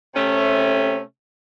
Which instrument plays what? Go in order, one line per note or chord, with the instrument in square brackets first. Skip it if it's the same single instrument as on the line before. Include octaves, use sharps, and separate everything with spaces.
[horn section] C3 A3 C#4